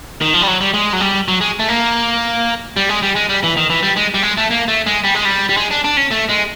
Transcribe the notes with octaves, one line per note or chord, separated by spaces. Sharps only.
D#3
F3
G3
F#3
G3
G#3
F#3
G3
F#3
G#3
A3
A#3
G3
G#3
G3
G#3
G3
E3
D#3
E3
G3
G#3
G3
G#3
A3
A#3
A3
G#3
G3
G#3
G3
G3
G#3
D4
D4
C#4
A3
G#3